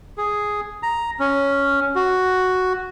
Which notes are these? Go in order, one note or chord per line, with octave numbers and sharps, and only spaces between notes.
G#4
A#5
C#4
F#4